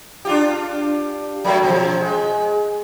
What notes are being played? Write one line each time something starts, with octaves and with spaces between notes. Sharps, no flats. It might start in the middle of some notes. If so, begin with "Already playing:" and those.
D4 F4 G4
F#3 A3 A#3
B2 F3
G#3